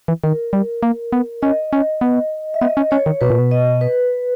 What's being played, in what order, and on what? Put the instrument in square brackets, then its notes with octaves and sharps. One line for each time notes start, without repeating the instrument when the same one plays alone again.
[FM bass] E3
[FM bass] D#3 [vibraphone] A#4
[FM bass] G3
A#3
B3
[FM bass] C#4 [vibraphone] D#5
[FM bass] C#4
B3
[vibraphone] E5
[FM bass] B3 [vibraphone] D#5
[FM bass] C#4
[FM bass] C#4 [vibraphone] C#5
[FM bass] D#3
[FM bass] B2 [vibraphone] B4
[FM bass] A#2
B2
[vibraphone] D#5
B4